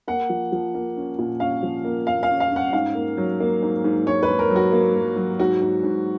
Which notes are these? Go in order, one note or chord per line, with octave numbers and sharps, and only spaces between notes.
A#3 F#5
F3
F3
A#3
C#4
A#2
C#4 F5
F3
A#3
A#3 F5
F5
C#4
F5
C#4 F#5
G#2 F5
A#3
F#3
A#3
G#2
G#2
G#2 C#5
B4
G#2
A#4
F#3
F#4
A#3
F#3
F#3
G#2 F#4
G#2
G#2